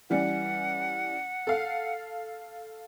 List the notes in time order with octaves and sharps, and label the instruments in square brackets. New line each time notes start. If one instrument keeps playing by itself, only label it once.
[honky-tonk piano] E3 G3 C#4 [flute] F#5
[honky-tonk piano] A4 F5